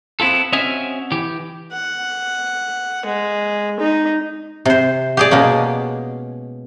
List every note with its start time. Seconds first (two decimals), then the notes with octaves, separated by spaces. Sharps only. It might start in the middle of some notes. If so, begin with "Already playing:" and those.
0.20 B3 C4 E4 F4 A4
0.52 C4 C#4 F#4 D#5 E5 G#5
1.12 E3 G4
1.73 F#5
3.06 G#3
3.80 D#4
4.65 C3 C5
5.17 G4 G#4 D5
5.31 B2 G#3 A#3 C#4